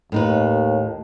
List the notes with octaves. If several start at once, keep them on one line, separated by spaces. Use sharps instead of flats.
D#2 A2 D#4 B4